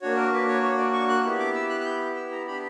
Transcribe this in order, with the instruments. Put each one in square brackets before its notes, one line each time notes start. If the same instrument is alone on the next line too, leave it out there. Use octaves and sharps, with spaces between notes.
[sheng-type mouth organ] A#3 D4 F#4 C#5
A#4
B4
C#5
C#5
D5
C#6
F#6
B3 E4 G4
D6
E6
F#6
F#6
G6
E6
A#5
B3 D4 G4 B5